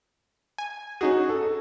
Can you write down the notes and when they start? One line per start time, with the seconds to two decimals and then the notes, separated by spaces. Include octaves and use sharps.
0.58 G#5
1.01 C#4 D#4 F#4 G#4
1.29 A4